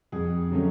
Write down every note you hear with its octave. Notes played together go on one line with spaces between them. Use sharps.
F2 G#4
D3 F#3 A3 C#4